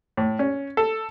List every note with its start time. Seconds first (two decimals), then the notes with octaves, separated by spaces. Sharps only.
0.17 A2
0.39 C#4
0.77 A4